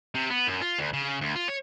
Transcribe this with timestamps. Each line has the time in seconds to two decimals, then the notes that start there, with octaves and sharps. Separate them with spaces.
0.15 C3
0.30 B3
0.47 F#2
0.61 F4
0.78 D2
0.93 C#3
1.21 D2
1.35 F4
1.48 C#5